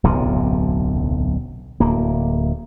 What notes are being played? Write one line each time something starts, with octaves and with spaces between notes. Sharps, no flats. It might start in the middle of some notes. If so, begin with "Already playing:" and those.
D1 B1 F#2 C3
D1 A#3